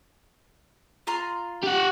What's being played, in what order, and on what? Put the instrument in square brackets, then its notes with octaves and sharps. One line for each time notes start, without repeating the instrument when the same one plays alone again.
[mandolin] F4 A#5 C6
[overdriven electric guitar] G4 F#5